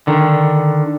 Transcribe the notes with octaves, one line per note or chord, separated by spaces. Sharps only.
D3 D#3